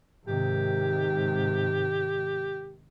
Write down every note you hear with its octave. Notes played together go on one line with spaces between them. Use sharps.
G#2 C3 D#3 G4